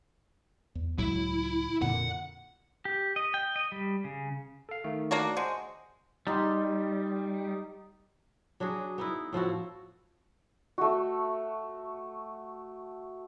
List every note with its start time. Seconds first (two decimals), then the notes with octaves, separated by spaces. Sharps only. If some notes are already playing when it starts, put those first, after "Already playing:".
0.75 E2
0.99 C#2 A2 F#3 E4
1.82 F2 A#2 D3 F#5
2.85 G4
3.16 D#5
3.34 G5
3.56 D#5
3.72 G3
4.04 C#3
4.69 A4 F5
4.84 D#3 A3
5.11 A#3 D4 F#4
5.37 G#3 C5 F#5
6.27 G3 D#4 G4 C6
8.60 F#3 D4 F#4 G#4
8.98 B3 D#4 E4
9.33 A2 F3 E4 F#4
10.78 A3 F#4